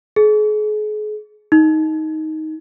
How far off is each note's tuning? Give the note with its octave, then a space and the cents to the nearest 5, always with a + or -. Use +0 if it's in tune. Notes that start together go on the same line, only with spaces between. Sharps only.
G#4 +40
D#4 +10